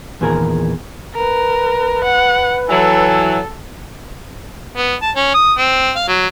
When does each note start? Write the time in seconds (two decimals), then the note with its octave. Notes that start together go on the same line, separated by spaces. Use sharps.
0.21 E2 A#2 D#3 G#4 A#4
1.15 A#4 B4
2.04 F#5
2.69 E3 F#3 A4
4.77 B3
5.02 A5
5.16 C#4
5.34 D#6
5.58 C4
5.96 F5
6.08 F#3